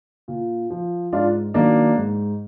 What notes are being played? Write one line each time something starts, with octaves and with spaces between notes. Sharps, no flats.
A#2
F3
G#2 D4 F4
D#3 F#3 A#3 D4
G#2